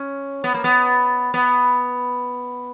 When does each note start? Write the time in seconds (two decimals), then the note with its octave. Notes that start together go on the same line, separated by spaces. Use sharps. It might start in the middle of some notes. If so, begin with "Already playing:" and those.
Already playing: C#4
0.44 B3
0.54 A#3
0.64 B3
1.34 B3